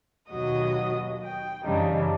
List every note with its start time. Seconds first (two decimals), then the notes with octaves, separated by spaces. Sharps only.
0.29 D#2 B2 F#3 F#4 D#5 D#6
1.22 G5
1.64 F#2 C#3 E3 G3 D4 D#4